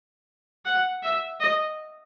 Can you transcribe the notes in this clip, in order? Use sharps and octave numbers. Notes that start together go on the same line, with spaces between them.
F#5
E5
D#5